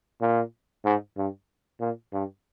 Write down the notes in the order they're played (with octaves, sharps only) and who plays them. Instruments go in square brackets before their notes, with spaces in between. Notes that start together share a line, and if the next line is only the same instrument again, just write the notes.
[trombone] A#2
G#2
G2
A#2
G2